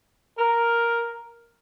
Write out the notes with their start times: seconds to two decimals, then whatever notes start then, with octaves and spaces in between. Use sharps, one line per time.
0.38 A#4